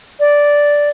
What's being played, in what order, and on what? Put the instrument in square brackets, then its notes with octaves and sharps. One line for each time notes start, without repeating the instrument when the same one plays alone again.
[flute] D5